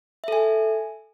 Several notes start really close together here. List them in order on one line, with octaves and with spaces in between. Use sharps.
E5 A4 G#5